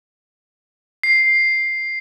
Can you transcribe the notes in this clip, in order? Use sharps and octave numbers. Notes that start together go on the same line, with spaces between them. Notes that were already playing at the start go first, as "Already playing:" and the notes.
C7